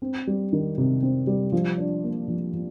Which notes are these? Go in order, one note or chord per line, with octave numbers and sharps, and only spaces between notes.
C4
G3
D#3
C3
C4
G3
F3
D4
A#3
F3
F3